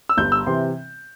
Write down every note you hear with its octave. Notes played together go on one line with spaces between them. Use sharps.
E6
G1 G2 G3 G6
E6
C3 E3 C6